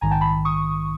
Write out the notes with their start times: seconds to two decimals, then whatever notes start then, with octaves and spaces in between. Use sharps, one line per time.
0.01 A#1 G#2 D#3 G#5 A#5
0.11 G5 A5
0.21 A5 B5
0.45 C#6 D#6